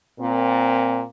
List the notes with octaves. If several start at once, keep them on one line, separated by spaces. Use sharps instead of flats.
A#2 C4